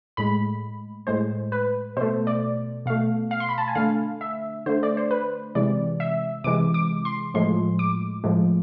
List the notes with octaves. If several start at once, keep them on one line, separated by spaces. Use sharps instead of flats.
A2 G#3 B5
A2 G#3 C5
B4
B2 A3 C5
D5
B2 A3 F5
F5
C6
B5
A5
G#5
D3 A3 F5
E5
D3 A3 C5
D5
C5
B4
C3 E3 G#3 D5
E5
C3 E3 G#3 D6
D6
C6
A2 F3 G#3 C6
D6
A2 F3 G#3